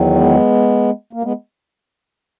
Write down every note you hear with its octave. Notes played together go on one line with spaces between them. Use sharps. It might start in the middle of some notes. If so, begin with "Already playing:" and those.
Already playing: E2 D#3 F#3
G#3 B3
A#3
G#3 B3